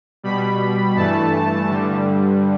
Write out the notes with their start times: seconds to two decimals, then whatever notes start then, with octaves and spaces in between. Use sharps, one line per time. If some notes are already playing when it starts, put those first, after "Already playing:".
0.23 B2 G3 B5
0.95 G2 E3 A3 A5
1.68 G2 D3 G3